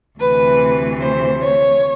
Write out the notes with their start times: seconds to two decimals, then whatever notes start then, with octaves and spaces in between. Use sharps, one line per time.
0.18 D2 C3 E3 B4
0.99 C5
1.41 C#5